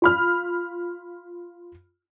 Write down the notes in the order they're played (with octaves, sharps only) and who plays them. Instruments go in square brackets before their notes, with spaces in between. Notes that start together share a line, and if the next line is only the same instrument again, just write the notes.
[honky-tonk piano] F4 B5 F6